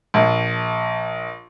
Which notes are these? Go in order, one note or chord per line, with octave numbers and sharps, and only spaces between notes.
A#1